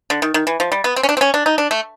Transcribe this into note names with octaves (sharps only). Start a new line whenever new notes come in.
D3
D#3
D#3
E3
F3
G3
B3
C4
C#4
D4
C4
C#4
D4
D#4
D4
A3